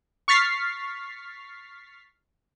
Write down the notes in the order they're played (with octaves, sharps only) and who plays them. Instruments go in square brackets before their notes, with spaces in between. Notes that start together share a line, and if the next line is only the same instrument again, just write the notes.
[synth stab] C#6 F6 A6 B6 C7